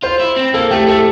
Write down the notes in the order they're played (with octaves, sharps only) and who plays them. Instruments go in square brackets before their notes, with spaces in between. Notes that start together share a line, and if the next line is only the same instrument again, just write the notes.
[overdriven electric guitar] F4 [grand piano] C5
[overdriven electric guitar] E4
C4
[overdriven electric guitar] A#3 [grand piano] A4
[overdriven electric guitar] A3 [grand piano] G4
[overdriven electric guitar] A3 [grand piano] A4